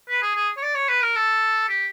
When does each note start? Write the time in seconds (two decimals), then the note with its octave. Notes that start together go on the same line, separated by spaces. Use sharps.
0.09 B4
0.22 G#4
0.35 G#4
0.57 C#5
0.62 D5
0.74 C#5
0.89 B4
1.02 A#4
1.16 A4
1.68 G4